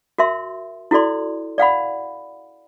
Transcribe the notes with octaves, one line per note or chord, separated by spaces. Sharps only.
F#4 A#4 E5 C6
E4 F#4 A4 D5 C6
D5 F5 F#5 B5